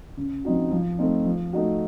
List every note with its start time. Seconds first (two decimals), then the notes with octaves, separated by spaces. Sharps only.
0.17 C#3
0.44 F3 C4 D#4 F#4
0.71 F3
0.98 A3 C4 D#4
1.26 F3
1.53 A3 D#4 F#4